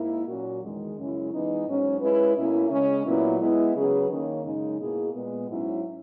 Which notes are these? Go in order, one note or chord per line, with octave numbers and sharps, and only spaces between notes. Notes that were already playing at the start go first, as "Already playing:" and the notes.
Already playing: G#2 A#3 E4
A#2 F#3 C#4 F#4
E2 D#3 G#3
F#2 C#3 G#3 C#4 E4
E3 G#3 B3 D#4
G#2 F#3 C#4
G#3 C#4 E4 B4
B2 A#3 C#4 E4
C#3 G#3 C#4
A#2 F#3 B3 E4
G#3 B3 E4
C#3 F#3 C#4 G#4 B4
D#3 A#3 C#4
F#2 C#3 G#3 D#4
B2 A#3 E4 G#4
A#2 G#3 B3
G#2 F#3 C#4 E4